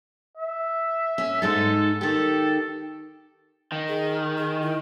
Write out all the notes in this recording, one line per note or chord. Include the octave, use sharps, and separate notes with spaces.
E5
C#4
G#2 G#3 D#4 A4
D#3 G4 A4
D#3
G#4
G#4
E4